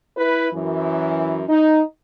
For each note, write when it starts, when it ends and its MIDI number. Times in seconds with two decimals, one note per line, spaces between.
0.17 0.48 64
0.17 0.48 71
0.54 1.42 42
0.54 1.42 52
1.49 1.81 63